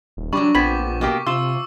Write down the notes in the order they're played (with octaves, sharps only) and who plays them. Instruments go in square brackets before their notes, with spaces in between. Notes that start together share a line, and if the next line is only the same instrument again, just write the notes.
[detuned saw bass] D#1
[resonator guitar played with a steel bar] F#3 D4 [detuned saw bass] G3 [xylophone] B5 [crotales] C#6 D6
[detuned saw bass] A#1 [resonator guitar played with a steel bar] F3 B3 C4 [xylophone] B5 G#6 B6
[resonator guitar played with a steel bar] B2 A#3 G4
[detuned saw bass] C3 [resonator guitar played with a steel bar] F4 [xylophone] C6 E7 [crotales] E6